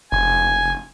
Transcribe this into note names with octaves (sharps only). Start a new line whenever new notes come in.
F1 G#5